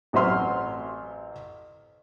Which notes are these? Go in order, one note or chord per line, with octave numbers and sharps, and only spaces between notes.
A1 F#3 C4 E5 C6 F6